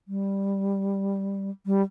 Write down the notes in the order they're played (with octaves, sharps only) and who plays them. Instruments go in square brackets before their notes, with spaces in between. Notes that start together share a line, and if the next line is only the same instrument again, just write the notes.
[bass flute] G3
G3